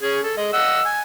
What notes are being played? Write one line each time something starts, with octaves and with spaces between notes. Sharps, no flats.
C#4 G#4
A4
G#3 D#5
D#5 F#5 E6
G#5